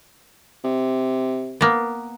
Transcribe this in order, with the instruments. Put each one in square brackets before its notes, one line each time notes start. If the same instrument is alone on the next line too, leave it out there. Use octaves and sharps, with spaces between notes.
[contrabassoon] C3
[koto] A#3 B3